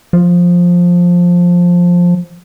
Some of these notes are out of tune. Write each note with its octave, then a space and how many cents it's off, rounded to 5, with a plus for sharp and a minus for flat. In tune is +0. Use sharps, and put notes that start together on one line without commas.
F3 +10